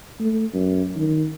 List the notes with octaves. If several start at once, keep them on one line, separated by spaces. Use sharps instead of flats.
A3
F#2
D#3